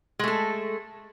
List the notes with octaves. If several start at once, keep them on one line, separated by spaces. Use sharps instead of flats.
G#3 A3 A4